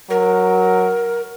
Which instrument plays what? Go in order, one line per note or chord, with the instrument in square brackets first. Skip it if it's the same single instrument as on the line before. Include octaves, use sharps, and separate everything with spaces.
[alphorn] F#3 [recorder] A#4